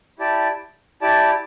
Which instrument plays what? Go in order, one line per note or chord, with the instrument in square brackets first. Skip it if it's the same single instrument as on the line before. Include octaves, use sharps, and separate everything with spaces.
[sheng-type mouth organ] E4 G4 D5 A5
E4 G4 D5 A5